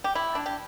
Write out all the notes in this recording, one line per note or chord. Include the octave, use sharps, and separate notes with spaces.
G4
E4
D4
G4